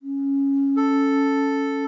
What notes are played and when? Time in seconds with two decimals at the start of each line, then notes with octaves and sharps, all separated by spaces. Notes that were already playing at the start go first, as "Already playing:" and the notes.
0.01 C#4
0.77 A4